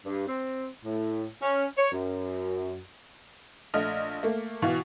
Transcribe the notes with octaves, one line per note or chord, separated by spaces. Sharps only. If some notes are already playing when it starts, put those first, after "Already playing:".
G2
C4
A2
C#4
C#5
F#2
A#1 A3 D#5 F6
A3 A#3
B2 E3 F5